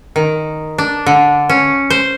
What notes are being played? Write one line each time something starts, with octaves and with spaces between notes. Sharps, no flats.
D#3
D4
D3
C#4
C5